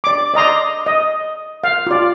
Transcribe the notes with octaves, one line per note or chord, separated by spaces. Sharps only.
D5 D6
D5 D#5 A#5 C6
D#5
F5
F4 D5